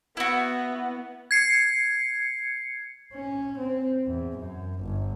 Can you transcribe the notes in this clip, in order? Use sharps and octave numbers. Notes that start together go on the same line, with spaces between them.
B3 E4 F#4
G#6 C7 C#7
C#4
C4
E2
F#2
G1